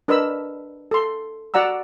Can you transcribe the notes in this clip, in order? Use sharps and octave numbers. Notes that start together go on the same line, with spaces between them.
D4 A#4 B4 D#5 B5 E6
A4 C6
F#4 D5 F#5 A#5 E6